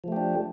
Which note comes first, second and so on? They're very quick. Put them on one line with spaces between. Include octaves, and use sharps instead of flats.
F3 A3 G4 D4